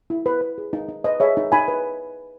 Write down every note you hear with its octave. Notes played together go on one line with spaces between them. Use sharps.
E4
B4
B4
G#4
D#4
D#4
B4 D#5
G#4 C#5 E5
D#4
D#4 G#5 B5
B4